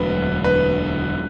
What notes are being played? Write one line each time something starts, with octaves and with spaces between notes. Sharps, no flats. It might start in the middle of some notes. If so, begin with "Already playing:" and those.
Already playing: E1 D2 D3 F#3 B4
B4